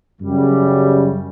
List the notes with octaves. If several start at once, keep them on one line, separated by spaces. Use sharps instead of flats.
F#2 C#3 G3